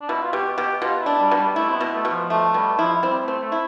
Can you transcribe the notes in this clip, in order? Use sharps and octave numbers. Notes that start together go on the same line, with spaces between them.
D4
B2 E4
F4
B2 G4
B2 G4
B2 F4
E4
D4
G3
B2
G3
A3 E4
C4
B3
B2
A3
B2
F3
F3 A3
B2 G3
F3 E4
G3 C4
A3
C4
A3
E4